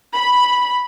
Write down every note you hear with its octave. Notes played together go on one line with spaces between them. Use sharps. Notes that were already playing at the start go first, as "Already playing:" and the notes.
B5